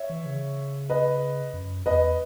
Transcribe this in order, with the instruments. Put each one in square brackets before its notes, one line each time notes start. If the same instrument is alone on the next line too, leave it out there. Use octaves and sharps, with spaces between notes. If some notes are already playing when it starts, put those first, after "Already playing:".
Already playing: [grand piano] C#5 E5
[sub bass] E3
C#3
[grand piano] B4 D#5
[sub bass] F#2
[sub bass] E2 [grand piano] B4 D#5